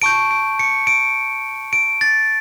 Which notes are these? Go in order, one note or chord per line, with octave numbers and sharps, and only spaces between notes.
A5 C#6 G6 D7
D7
C#7
D7
D7
A6